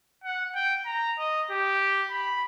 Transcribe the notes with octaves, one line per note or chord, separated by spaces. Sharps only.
F#5
G5
A#5
D#5
G4
B5